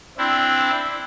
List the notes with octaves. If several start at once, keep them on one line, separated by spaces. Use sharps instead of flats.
C4 D4 E4